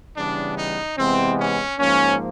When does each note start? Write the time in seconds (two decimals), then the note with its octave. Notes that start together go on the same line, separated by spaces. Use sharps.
0.16 C#3 E3 G3 B3 D4
0.57 D#4
0.97 C3 E3 G#3 B3 C4
1.39 C#4
1.79 G#2 F3 A#3 C#4